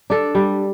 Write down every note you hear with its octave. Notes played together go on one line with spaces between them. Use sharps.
D4 A4
G3